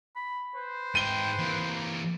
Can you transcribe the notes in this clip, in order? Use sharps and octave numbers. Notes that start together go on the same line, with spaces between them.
B5
B4 C5
G#2 G5 D#7 G7
E3 A#3